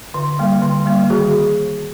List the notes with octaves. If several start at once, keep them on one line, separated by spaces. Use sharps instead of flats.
D3
G3 A#3
D3
G3 A#3
D#3 F#4 G#4